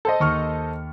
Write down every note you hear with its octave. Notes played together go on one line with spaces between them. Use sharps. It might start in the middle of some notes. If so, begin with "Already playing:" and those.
A4 C5 D#5
D#2 C#6 F6